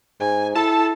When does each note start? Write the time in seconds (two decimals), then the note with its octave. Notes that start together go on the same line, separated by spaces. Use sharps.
0.20 G#2 G#5
0.55 E4 A4 A5